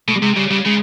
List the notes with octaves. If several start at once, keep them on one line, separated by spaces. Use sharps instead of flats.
B2 A3
G3
C3 G#3
C#3 G3
C#3 G3
C#3 G#3